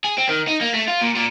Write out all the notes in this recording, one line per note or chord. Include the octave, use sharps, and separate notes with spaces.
G#4
C4
D#3
D#4
A#3
A3
F4
A#2
A#2